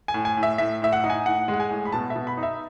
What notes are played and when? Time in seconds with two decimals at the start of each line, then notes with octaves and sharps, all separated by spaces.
0.08 G#5
0.14 A2
0.25 G#5
0.37 A2
0.43 E5
0.58 A2 E5
0.82 A2 E5
0.93 F#5
1.04 D#4
1.10 G#5
1.26 A2 F#5
1.48 G#3
1.54 F#5
1.60 G#5
1.71 A2
1.85 B5
1.92 B2 A5
2.10 E5
2.16 B2
2.27 B5
2.37 D#4
2.43 E5